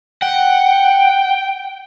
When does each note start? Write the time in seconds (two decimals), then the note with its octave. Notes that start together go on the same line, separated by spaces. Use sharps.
0.22 F#5 G5